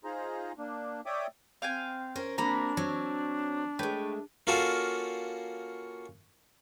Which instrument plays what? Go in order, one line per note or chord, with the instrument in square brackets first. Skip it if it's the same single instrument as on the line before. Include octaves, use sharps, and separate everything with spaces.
[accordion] D#4 F4 G#4 C5 A#5
A#3 D4
C#5 D5 E5 G5 D6 D#6
[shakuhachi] C4 [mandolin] F5 G5 G#5
[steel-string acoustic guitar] C#4 A#4 C5
[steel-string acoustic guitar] A#3 C4 F#4 [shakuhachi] D4 [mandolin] A#5 B5
[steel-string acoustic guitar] F#3 C4 [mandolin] C#5
[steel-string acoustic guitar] G#3 A3 [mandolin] B4 C#5 G5
[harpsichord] A#3 C#4 F4 F#4 A4 A#4